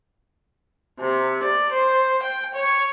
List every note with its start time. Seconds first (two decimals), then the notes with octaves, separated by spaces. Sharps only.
1.00 C3
1.42 D5
1.72 C5
2.23 G5
2.55 C#5